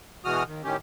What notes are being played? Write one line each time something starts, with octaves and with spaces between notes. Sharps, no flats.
B2 E3 G#3 F#4 D#6 F6
D#2 D#3
A2 D#3 C#4 G4